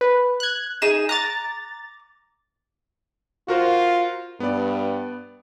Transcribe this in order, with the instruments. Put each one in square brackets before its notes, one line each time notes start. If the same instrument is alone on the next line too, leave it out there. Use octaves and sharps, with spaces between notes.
[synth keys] B4
F#6 G#6
[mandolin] D#4 G#4 [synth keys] E7
[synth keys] A#5 A6 [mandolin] D6 F#6
[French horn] F4 [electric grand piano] F#4 A#4 C5
[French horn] G2 [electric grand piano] B3 D5